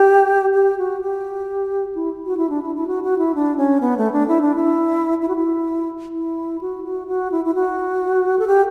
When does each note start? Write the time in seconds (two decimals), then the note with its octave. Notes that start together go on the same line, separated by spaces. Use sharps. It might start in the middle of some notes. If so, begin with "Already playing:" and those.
Already playing: G4
0.54 G4
0.78 F#4
1.01 G4
1.95 E4
2.26 F#4
2.37 E4
2.49 D4
2.62 E4
2.75 E4
2.87 F#4
3.03 F#4
3.18 E4
3.35 D4
3.57 C#4
3.80 B3
3.97 A3
4.12 D4
4.28 E4
4.41 D4
4.55 E4
5.22 E4
5.28 F#4
5.36 E4
6.15 E4
6.61 F#4
6.84 F#4
7.07 F#4
7.32 E4
7.45 E4
7.55 F#4
8.39 A4
8.47 G4